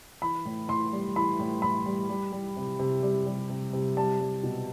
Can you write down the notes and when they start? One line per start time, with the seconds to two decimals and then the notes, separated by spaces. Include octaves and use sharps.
0.22 E3 B5
0.45 A2
0.68 A2 C6
0.93 G3
1.16 E3 B5
1.39 A2
1.62 A2 B5
1.86 G3
2.09 G3
2.32 G3
2.56 C3
2.79 C3
3.03 G3
3.26 G3
3.50 C3
3.73 C3
3.97 G3 A5
4.20 G3
4.43 B2